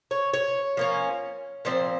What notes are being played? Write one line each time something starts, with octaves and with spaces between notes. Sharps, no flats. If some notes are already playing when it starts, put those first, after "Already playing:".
C#5
C#5
F3 A#3 C#4
A#2 F3 C4 C5